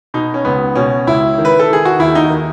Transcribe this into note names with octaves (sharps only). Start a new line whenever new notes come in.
B2 D#4
C#4
C#2 B3
B2 C#4
C#2 E4
D#3
B4
A4
D#3
G#4
F#4
D#2 E4
D#4
D#3